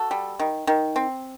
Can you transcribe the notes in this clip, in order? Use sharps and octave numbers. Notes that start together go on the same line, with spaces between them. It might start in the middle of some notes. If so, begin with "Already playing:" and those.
Already playing: F#4 A4
G3
D#3
D#3
C4